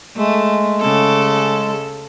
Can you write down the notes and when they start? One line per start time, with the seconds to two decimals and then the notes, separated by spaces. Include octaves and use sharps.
0.17 G#3 A3
0.81 C#3 A4